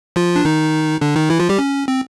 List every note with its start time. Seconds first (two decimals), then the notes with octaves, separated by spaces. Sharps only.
0.16 F3 F4
0.36 D4
0.45 D#3 D#4
1.01 D3 D4
1.16 D#3 D#4
1.30 E3 E4
1.40 F3 F4
1.49 G3 G4
1.59 C#4
1.88 C4